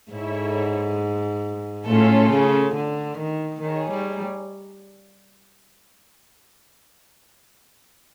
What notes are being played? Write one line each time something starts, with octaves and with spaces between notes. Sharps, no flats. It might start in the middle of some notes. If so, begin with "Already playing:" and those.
G#2 E4 A4 C#5 E5
A2 C#4 F4 A4
C#3
D3
D#3
D#3 D#4 G#4 C#5
G3